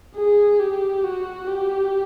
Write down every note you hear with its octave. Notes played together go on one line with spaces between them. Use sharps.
G#4
G4
F#4
G4